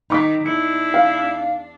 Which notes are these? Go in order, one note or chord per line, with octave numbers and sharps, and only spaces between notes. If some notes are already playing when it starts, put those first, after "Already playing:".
D#3 D#4 B5 D6 B6
E2 D4 E4 C#7
F5